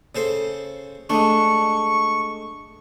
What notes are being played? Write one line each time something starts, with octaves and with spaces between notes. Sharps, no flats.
C#3 A4 C5
G#3 A3 D4 C#6